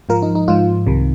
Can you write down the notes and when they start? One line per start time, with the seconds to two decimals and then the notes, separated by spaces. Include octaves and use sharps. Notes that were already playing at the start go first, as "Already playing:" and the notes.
0.09 G#2 F3 F4 A#4
0.22 D#4
0.35 D#4
0.48 G#2 F3 F4
0.86 C2 C3 D#3